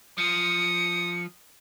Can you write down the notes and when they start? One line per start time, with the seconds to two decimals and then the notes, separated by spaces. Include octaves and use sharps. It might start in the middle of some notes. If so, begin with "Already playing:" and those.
0.18 F3 D#6 C#7